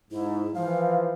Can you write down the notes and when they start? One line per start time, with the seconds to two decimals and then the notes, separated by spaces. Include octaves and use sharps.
0.11 G#2 E4
0.54 E3 F3 F5